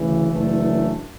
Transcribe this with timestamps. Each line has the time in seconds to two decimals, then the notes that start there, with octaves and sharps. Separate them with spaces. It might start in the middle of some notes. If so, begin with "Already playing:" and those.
Already playing: D2 C#3 E3
0.30 F#1 F#2 E3 A3 D4